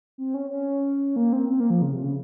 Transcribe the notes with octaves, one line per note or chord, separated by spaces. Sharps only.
C4
C#4
C#4
A#3
C4
C4
A#3
F3
C#3
C3
C#3